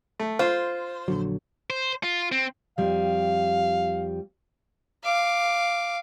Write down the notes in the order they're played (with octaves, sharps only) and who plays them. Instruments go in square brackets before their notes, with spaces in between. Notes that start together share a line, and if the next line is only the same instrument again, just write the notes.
[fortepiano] A3
[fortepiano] F4 [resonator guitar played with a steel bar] C5
[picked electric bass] A#1 D3 F#3
[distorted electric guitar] C5
F4
C4
[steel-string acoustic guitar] F2 G3 [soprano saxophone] F5
[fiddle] F5 D6